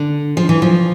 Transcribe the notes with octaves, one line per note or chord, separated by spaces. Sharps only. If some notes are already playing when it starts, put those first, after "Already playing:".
Already playing: D3
F3
E3
F3